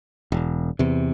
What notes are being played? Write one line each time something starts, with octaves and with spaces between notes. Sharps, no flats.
E1
E2 C3